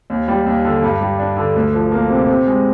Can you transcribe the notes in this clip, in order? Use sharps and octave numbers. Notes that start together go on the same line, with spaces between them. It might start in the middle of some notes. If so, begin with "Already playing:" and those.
D#2
G3
D#2
D3
G2
G3
D4
D3
D2
F3
A#3
C3
C3
G#3